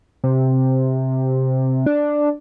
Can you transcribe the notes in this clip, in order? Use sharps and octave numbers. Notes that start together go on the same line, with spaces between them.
C3
D4